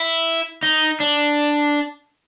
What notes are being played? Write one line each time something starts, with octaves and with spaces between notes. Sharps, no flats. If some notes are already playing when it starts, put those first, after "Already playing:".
Already playing: E4
D#4
D4